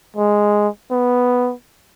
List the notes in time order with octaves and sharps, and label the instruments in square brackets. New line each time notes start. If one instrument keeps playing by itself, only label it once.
[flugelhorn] G#3
B3